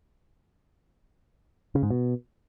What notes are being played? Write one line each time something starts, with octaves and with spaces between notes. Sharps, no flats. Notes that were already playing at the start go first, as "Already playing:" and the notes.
C#3
G#2
B2